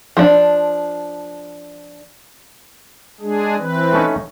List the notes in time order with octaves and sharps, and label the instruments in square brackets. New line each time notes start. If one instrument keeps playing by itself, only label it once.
[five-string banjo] F3 D4
[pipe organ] G#3 D4 G#4
E3 C4 B4
[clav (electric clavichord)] A3 C#4 D#4